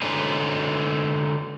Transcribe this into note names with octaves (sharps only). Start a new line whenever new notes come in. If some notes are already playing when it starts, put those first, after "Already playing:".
D3 G#3 C#4 D#4 G#4 B4